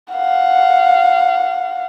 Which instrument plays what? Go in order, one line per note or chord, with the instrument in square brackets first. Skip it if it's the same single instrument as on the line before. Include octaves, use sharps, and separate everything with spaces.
[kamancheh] F5 F#5